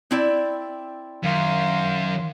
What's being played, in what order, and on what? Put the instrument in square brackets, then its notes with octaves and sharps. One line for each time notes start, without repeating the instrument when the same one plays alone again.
[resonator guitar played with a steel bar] C4 E4 D5
[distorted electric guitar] F#2 [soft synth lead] D#3 [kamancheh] F5 C6